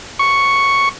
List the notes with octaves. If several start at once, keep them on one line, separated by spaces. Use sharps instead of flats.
C#6